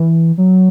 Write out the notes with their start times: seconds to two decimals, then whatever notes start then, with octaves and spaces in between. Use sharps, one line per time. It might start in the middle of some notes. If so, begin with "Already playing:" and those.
Already playing: E3
0.38 F#3